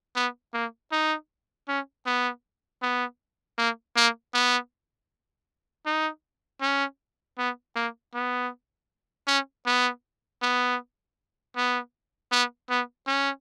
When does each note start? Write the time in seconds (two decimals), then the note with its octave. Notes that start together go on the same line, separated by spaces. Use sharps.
0.16 B3
0.54 A#3
0.92 D#4
1.68 C#4
2.06 B3
2.82 B3
3.58 A#3
3.97 A#3
4.34 B3
5.86 D#4
6.62 C#4
7.38 B3
7.76 A#3
8.15 B3
9.28 C#4
9.67 B3
10.42 B3
11.56 B3
12.32 B3
12.70 B3
13.08 C#4